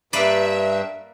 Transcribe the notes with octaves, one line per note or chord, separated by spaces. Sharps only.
G2 A#3 B4 D5 E5